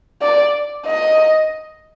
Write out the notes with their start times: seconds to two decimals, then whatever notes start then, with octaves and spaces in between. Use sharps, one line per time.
0.22 D5
0.86 D#5